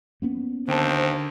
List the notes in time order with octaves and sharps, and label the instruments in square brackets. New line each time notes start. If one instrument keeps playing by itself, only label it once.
[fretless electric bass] A#3 B3 C#4
[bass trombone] D#2 [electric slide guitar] D3 G5 A5 [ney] C5